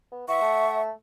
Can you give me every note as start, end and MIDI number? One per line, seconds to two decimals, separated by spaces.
0.12 0.27 59
0.28 0.40 52
0.28 0.81 76
0.28 0.81 78
0.28 0.81 85
0.41 0.90 57